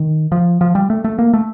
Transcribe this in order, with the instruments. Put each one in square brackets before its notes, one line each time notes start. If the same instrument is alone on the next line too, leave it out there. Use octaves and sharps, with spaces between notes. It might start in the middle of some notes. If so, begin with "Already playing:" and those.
Already playing: [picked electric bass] D#3
F3
F3
G3
A3
A3
A#3
A3